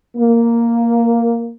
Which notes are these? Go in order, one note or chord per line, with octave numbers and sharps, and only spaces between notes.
A#3